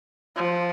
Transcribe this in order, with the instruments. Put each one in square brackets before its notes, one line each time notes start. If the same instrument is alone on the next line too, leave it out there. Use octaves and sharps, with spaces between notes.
[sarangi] F3